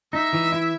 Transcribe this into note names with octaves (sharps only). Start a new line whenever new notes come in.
D#4 E5
E3
E4